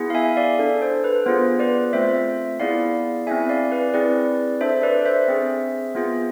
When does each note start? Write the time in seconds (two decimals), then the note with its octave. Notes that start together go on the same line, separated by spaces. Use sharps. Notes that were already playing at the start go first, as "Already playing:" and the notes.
Already playing: B3 E4 G#4
0.10 F5
0.15 E5 G#5
0.37 D5 F5
0.59 D4 A4
0.82 C5
1.04 B4
1.26 B3 F4 G#4 C5
1.59 B4 D5
1.93 A3 C4 F4 C5 E5
2.60 B3 E4 G#4 D5 F5
3.27 C4 E4 G#4 E5 G#5
3.49 D5 F5
3.72 B4 D5
3.94 C4 E4 G#4 B4 D5
4.61 D4 A4 C5 E5
4.83 B4 D5
5.05 C5 E5
5.28 C4 G#4
5.95 B3 F4 G#4